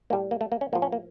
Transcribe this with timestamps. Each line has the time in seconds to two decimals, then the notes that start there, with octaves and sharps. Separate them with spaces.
0.10 A2 G3 A#3
0.31 A#3
0.41 A3
0.52 A#3
0.61 C#4
0.73 A2 F3 A#3
0.82 C#4
0.92 A#3